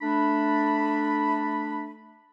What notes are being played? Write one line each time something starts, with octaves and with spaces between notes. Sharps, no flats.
A3 D4 B5